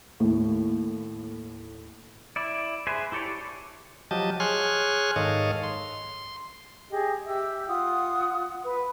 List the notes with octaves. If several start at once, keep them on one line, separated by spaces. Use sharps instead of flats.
D#2 A2
E4 D5
G#4 B4 C5 E5 G#5
E4 G4 A4 C#5 D5
F3 F#3 G4 D#5 A5
G#4 C#5 G#5 C6 F6 F#6
G#2 D#3 A4 C#5 D#5 F5
C6
G4 G#4 D#5
G4 E5 E6
F4 F#5 D#6
B4